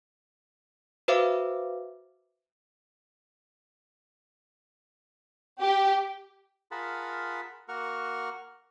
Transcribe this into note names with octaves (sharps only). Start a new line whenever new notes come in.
F#4 B4 C5 E5 F5 D6
G4
F4 G#4 A#4 F#5 A5 B5
A#3 F#4 A#4 F#5 C#6 F6